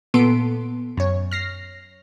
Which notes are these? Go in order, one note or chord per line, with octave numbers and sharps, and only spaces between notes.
A#2 B3 A4 C6 D7
F#2 C#5
F6 A#6 C7